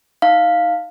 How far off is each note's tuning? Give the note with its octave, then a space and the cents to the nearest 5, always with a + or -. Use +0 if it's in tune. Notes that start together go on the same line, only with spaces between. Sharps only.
D#4 +20 F5 +0